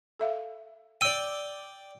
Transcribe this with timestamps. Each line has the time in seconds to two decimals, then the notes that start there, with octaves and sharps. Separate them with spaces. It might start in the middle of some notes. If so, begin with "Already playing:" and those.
0.19 A4 E5 F5
1.01 D5 G5 E6 D#7